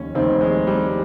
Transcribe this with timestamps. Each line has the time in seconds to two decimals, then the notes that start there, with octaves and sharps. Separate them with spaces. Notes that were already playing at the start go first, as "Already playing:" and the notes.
Already playing: F1 D#2 D#3 C#4
0.15 F1 D#2 D#3 C4
0.41 G#3
0.67 G3